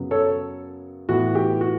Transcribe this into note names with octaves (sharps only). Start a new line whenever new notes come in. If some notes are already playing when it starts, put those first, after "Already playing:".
Already playing: F#2 C#3 F#3 B3
A4 C#5
A2 E3 B3 F#4
G4
F#4